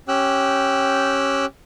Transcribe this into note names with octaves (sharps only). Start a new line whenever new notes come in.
C#4 G4 G5 E6 F#6